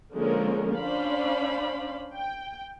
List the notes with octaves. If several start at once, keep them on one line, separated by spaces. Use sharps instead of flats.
D3 F3 G#3 A#3 C#4 A#4
C#4 D4 C5 D5 F5 B5
G5